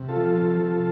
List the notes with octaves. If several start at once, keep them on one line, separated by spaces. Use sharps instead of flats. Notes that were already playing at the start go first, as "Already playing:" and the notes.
Already playing: C3
F4 A4
F3
C3
F3